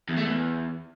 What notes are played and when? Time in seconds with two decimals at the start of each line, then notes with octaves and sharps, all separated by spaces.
0.09 E2
0.17 A3
0.25 E2